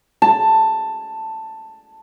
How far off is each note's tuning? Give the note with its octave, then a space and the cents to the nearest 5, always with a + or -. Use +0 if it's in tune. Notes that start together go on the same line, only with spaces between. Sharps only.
A5 +10